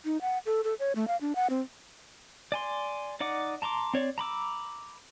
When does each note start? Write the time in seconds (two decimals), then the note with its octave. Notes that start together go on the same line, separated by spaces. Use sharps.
0.05 D#4
0.21 F#5
0.46 A4
0.64 A4
0.79 C#5
0.95 A3
1.08 F5
1.21 D4
1.35 F#5
1.50 C4
2.52 D5 G#5 C6
3.20 D#4 D5 F#5 D6
3.62 A5 A#5 C6 D6
3.94 C4 C#5 D5
4.18 A#5 B5 D6 E6